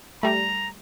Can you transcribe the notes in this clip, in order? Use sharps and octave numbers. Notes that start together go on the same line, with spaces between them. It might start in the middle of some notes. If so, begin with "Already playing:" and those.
G3 A3 A#5